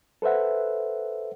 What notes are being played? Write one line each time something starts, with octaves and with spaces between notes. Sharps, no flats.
A4 B4 C5 E5 F#5